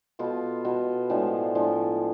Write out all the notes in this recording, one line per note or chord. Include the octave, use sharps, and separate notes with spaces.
B2 B3 F4 A4
B2 B3 F4 A4
A2 F3 G#3 D4
A2 F3 G#3 D4